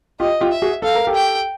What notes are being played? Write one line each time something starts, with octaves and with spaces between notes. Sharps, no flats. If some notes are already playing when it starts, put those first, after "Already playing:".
F4 G4 D#5
F4 G4
E5
F#4 G#4
A4 F5
A#4
G4 A4
G5